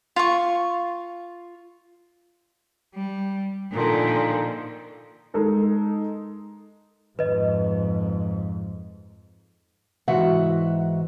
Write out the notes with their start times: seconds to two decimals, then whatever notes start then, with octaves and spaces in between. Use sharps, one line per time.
0.16 F4 C#6
2.93 G3
3.71 A#2 D3 D#3 F3
5.34 G#3 D#4 A4 A#4
7.19 F2 G#2 B4 D#5
10.08 G#2 E3 F#4 E5 F#5